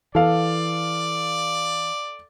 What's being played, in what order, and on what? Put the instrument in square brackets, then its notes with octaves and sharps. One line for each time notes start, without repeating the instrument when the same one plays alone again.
[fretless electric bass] E3 [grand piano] A4 F5 [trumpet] D5